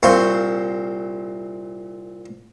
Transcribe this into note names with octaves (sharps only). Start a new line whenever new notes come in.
C2 A#2 C4 F5 C6 C#6